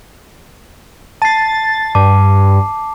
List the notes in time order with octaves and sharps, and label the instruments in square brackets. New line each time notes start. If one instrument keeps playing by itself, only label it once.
[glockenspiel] A5 C7 [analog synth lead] A6
[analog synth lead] G2 [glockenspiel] A5 D6